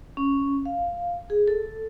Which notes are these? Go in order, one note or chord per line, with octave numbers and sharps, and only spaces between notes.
C#4
F5
G#4
A4